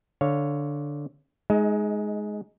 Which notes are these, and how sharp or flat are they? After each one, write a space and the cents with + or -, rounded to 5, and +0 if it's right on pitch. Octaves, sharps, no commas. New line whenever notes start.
D3 +0 C#5 +0 F5 +0
G#3 +10 D#4 +0 D#5 +45